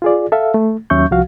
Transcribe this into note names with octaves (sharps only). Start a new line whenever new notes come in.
F4 G#4 D5
A4 E5 F5
A3
D#2 F#3 C#4 E5 C#6 G6
C2 F3 F#4 F5